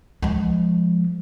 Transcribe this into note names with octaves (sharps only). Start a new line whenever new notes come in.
F3 G#3